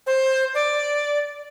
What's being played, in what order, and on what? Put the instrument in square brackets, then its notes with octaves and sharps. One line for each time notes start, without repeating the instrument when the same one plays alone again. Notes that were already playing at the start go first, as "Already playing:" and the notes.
[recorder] C5
D5